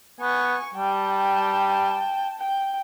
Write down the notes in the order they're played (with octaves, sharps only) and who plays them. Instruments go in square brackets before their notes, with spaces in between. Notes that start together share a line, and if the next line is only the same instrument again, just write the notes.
[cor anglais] B3 [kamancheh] G#5 C#6
[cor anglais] G3 [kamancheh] G5 A5
[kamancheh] G5